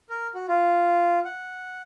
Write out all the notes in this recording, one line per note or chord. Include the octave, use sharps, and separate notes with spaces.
A#4
F#4
F4
F#5